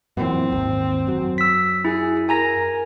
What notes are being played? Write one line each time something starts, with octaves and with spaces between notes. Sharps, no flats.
F#2 A#2 E3 C4
G#1 D#2
F#2 F#3
E6 B6
E4 G#4
A#4 G#5 A#5 A#6